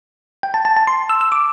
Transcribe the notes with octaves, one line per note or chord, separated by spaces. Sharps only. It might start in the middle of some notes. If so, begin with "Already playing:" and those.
G5
A5
A5
A5
C6
E6
E6
D6